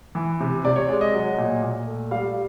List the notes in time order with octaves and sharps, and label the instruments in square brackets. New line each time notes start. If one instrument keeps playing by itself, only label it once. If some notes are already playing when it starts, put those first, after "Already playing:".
[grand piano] E3
C3
C3 D5
C#5
G#3 D5
D#5
F#3
A#2
A#2
A3
G3 F5